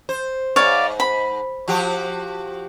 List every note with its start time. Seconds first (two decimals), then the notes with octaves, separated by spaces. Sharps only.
0.09 C5
0.56 G#2 C#5 D5 F5
1.00 B5
1.68 F3 F#4 G4